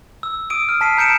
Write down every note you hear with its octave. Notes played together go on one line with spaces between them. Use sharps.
E6
D#6 E6 D7 D#7
F6
A5 B6 C7 D#7
A#5 G6 C#7 D7 E7